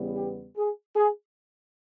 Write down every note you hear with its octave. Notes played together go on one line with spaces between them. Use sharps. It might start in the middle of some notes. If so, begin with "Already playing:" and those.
Already playing: E2 C#3 G3 B3
G4
G#4
G#4